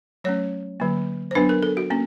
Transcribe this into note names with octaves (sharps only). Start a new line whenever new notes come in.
F#3 A3 C#4 C#5
D3 F#3 A#3
C5
F#3 B3 D4 B4
A#4
A4
F#4
A#3 C#4